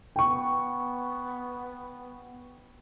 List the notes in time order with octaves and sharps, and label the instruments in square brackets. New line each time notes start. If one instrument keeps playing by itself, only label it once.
[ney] B3 [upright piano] G5 C#6